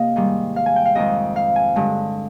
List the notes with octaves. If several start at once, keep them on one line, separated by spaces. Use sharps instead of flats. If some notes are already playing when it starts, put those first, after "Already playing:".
Already playing: C3 A#3 D#5 F5
G#2 D#3 G3
F5
G#5
G5
F5
F2 D#3 G#3 D#5
F5
G#5
G2 D3 G#3